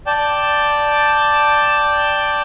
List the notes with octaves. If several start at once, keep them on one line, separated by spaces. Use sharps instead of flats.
D5 G5 A5